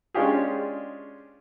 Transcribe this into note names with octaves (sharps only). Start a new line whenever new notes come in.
G#3 C#4 D4 F4 G4 G#4